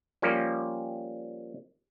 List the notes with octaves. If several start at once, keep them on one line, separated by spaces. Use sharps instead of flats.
F3 G3 A#3 C#4